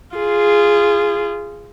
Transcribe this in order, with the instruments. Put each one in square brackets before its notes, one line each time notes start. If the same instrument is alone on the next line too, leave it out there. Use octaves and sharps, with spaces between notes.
[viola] F4 G#4